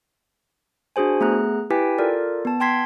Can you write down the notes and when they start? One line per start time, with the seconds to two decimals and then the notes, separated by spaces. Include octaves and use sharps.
0.96 D4 F#4 G#4 C5 G#5
1.21 A3 B3 G#4 A#5 F#6
1.70 E4 G4 B4 G5 G#5 B6
1.98 F4 A4 A#4 D5
2.45 B3 A5
2.60 G5 A5 C6 G#6 B6 C7